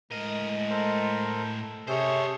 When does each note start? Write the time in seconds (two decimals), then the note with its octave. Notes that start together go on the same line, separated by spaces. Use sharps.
0.12 A2 G#3 A#4 D#5
0.70 A4 A#4 C5
1.88 C3 C#4 G#4 A4 C5 C#5